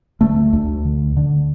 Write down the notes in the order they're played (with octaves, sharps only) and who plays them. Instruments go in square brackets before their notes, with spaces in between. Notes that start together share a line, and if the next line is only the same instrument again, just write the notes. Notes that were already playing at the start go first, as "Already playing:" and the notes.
[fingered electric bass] D2 A3
D2
D3
D3